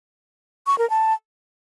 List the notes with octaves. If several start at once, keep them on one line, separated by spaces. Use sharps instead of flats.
C#6
A#4
A5